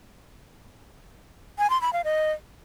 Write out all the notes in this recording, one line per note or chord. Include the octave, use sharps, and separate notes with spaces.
G#5
C6
B5
F5
D#5